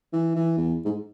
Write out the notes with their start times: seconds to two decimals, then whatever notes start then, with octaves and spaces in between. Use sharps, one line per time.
0.13 E3
0.36 E3
0.58 E2
0.85 G#2